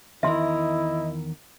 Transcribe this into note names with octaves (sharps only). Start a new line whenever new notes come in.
E2 D#3 E4 A#4 D#5 E5 C6